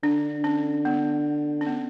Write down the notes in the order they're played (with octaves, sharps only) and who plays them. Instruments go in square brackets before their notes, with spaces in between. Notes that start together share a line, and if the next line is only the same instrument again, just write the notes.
[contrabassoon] D3 [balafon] D4
[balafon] C#4
B3
C#4
B3